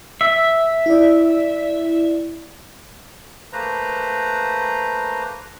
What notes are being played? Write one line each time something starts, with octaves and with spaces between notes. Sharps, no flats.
E5
E4 D5
A3 A#3 B4 C5 A#5